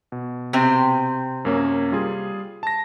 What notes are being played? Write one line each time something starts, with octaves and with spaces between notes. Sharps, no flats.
B2
C3 C4
F#2 A#3 C#4
G3 F4 G#4
A5 A#6